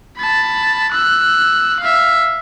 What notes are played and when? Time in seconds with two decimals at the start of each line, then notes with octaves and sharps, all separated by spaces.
0.18 A5 B5
0.91 E6 F#6
1.80 E5 F5